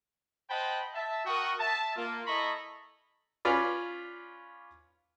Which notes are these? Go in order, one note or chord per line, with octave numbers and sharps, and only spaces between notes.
C5 D#5 F#5 G5 A5 B5
E5 A5
F#4 A#4 F#5 G5 C#6 D#6
E5 A5
A#3 F4
E4 A4 D#5 A#5 B5 C#6
C#4 F4 B4 D5